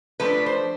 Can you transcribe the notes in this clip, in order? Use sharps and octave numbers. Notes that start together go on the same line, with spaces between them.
F3 A3 D4 B4
C5